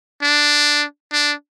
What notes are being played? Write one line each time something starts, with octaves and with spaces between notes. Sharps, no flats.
D4
D4